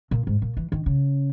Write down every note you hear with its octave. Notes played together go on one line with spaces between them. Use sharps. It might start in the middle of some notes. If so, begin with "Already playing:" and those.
A#2
G#2
A#2
E3
D#3
C#3